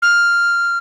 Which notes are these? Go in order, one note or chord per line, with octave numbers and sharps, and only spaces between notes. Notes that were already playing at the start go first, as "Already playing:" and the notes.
F6